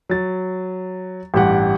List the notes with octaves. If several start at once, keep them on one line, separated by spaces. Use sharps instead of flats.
F#3 A6
A1 G2 G4 F#5